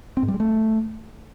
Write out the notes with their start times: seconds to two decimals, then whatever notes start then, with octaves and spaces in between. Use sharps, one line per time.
0.17 C4
0.23 G#2
0.28 G3
0.34 G#3
0.40 A3